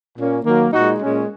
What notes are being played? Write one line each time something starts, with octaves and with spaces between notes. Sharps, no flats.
A#2 A#3 C#4
D#3 F#3 A#3
A#2 G#3 D#4 F#4
A#2 G#3 C#4